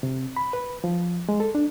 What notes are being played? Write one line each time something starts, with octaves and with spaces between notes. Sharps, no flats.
C3
B5
B4
F3
G#3
A4
D4